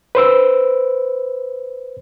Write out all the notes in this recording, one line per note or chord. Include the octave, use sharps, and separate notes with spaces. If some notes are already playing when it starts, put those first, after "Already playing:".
B4 C5 E6